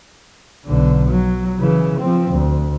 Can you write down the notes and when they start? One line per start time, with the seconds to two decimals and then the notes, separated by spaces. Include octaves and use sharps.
0.66 B1 D3
1.10 F#3
1.58 C#3 E3
2.00 F3 C4
2.31 D2